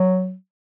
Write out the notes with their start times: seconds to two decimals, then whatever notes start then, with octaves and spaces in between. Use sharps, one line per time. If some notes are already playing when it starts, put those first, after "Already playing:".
Already playing: F#3